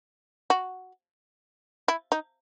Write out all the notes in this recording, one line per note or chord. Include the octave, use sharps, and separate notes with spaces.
F#4
E4
D#4